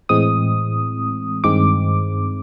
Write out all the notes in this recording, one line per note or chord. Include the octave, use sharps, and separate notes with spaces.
A2 E3 G#3 C4 D#6
G2 D#3 G#3 C4 D6